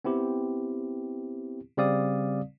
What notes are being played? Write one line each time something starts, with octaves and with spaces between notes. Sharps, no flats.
B3 C4 E4 G4
C#3 G3 C4 D5 F5 D#6